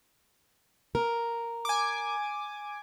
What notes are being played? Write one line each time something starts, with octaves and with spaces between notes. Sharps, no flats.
A#4
G#5 D6